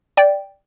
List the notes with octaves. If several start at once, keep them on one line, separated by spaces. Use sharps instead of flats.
D5 G5